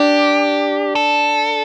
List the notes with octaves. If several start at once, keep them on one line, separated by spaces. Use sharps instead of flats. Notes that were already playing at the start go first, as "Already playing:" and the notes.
Already playing: D4 G4
A4